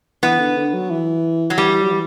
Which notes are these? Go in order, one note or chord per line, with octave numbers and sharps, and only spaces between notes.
E3 B3
D3
D3
F#3
E3
F#3
E3 G3
F#3
E3